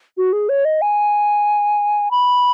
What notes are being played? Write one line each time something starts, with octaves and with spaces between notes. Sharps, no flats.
F#4
G#4
C#5
D#5
G#5
B5